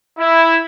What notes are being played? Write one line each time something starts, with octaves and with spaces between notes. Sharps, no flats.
E4